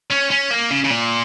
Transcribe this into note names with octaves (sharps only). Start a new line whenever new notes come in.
C#4
C#4
A#3
C#3
C#3
A#2